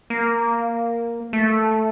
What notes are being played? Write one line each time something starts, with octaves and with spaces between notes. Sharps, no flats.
A#3
A3